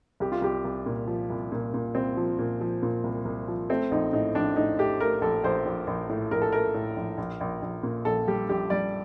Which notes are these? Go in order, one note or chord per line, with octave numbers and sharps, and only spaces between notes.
C2 G4
F4
C2 G4
C2
A#2
F3
C2
A#2
A#2
C2 C4
F3
A#2
F3
A#2
C2
C2
F3
A3 C4
A#1 D#4
A2 D#4
A#1 D4
A2 D#4
A3 G4
A3 A#4
A#1 A4
A#1 C5
A#1
A#1
A2
A#1 A#4
A4
A3 A#4
A2
A#1
A#1
A#1
A#1
A#2
A#1 A4
G3 G4
A#1 G4
G3 D5